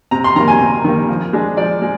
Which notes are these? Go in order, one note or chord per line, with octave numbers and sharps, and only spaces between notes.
C3 A#5
C6
D#3 G3 A#3 A#5
G#5
C3
D#3 G3 A#3
F3
G#3 D4
F3 D5
G#3